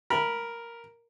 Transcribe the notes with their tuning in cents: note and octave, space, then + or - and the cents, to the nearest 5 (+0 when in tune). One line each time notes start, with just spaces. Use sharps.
A#4 +0 B5 -15